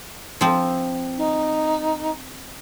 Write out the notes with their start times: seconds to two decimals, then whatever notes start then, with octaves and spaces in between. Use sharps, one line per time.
0.41 F3 C4
1.17 D#4